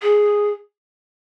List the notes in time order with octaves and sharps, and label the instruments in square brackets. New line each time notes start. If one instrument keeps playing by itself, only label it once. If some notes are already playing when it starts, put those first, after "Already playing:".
[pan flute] G#4